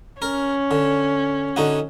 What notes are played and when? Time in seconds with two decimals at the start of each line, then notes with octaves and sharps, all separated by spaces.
0.22 C#4 A#4
0.71 D3
1.56 D3 D#4 F#4